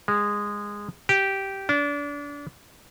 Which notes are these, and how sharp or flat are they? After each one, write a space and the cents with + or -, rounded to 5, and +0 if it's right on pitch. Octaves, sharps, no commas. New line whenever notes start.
G#3 -15
G4 -10
D4 -30